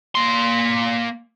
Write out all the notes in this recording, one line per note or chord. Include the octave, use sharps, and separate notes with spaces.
A#3 C6